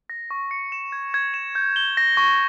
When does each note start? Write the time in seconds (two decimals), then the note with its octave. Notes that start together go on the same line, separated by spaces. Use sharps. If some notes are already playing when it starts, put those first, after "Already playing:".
0.10 A#6
0.31 C#6
0.51 C#7
0.72 E7
0.92 G#6
1.14 G#6
1.34 E7
1.55 G6
1.76 G7
1.97 A#6
2.17 C#6